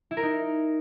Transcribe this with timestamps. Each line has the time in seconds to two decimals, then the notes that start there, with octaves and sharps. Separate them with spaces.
0.11 E4
0.17 A#4
0.23 D#4